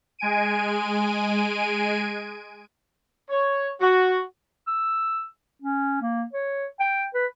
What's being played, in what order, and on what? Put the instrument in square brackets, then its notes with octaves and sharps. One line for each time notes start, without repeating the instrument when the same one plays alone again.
[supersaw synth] G#3 G#5 D7 D#7
[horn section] C#5
F#4
[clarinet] E6
C#4
A#3
C#5
G5
B4